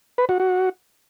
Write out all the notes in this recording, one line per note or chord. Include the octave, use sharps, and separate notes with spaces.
B4
F#4
F#4